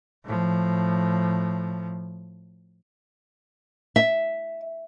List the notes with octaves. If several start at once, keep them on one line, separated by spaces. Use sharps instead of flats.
A2 F3
E5